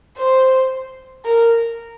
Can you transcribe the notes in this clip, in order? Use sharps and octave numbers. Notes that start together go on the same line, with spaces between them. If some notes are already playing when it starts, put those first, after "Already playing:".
C5
A#4